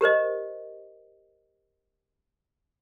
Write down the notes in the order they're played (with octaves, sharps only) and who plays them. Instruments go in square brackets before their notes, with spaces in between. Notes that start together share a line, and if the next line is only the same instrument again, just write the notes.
[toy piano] G4 A#4 C5 D#5